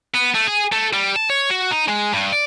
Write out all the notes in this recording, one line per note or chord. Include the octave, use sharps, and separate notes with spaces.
B3
A3
G#4
A3
G3
A5
C#5
F#4
D#4
G#3
G2
D5